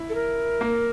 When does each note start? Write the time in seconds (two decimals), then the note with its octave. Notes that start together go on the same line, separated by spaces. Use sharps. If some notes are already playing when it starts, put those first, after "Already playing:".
Already playing: E4
0.09 A4
0.15 A#4
0.61 A#3